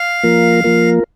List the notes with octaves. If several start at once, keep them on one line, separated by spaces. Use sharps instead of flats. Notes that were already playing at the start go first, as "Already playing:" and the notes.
Already playing: F5
F3 A#3 F4 A#4
F3 A#3 F4 A#4